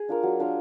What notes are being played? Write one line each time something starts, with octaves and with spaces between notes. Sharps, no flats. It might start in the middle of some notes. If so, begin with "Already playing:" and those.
Already playing: G#4
D4 F4 A#4
F#3
D4 F4 A#4